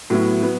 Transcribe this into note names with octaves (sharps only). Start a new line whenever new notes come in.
A2 F#3 B3 E4
F#3 B3